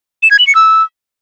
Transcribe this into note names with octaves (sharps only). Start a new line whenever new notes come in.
E7
G#6
F#7
C#7
E6